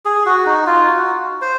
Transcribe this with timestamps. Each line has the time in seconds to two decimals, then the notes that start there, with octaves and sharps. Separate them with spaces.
0.05 G#4
0.26 F#4
0.46 D#4
0.67 F4
0.87 F#4
1.41 C5